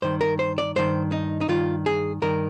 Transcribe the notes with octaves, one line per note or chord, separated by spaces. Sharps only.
G2 D#3 C5
A#4
C5
D5
G2 D#3 C5
D#4
D#4
G2 D#3 F4
G#4
G2 D#3 A#4